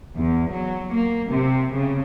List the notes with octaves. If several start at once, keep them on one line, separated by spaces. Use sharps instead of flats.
E2
F#3
A#3
C3
C#3